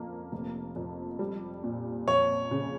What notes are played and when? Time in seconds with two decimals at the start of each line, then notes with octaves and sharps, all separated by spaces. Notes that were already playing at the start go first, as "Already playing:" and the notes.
Already playing: F2 A#3
0.32 F1
0.76 F2
1.19 G3
1.64 A#2
2.08 F2 C#5
2.51 C#3